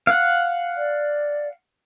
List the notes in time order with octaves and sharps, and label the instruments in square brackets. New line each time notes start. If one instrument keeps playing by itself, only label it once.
[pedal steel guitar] F5 F#5
[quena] D5